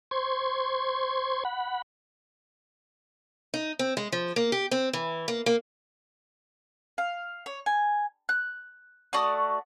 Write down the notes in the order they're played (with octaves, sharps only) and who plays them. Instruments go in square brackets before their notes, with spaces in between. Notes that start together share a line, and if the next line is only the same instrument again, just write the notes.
[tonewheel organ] C5 C6 C#6 G#6
F#5 B5
[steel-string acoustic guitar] D#4
C4
G#3
F3
A#3
G4
C4
E3
A#3
A#3
[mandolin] F5
C#5
G#5
F#6
A3 F#4 D5 D#6